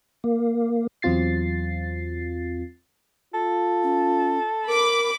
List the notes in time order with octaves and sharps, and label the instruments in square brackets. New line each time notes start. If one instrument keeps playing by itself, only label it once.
[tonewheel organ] A#3
[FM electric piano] E2 F#3 C4 F4 A6 C7
[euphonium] F4 [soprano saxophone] A4
[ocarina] C#4
[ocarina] A#4 [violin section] B5 D6